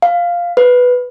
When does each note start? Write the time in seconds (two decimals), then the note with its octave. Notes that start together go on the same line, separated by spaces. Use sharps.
0.02 F5
0.57 B4